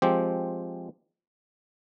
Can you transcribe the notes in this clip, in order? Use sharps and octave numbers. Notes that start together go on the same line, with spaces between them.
F3 G#3 C4 G4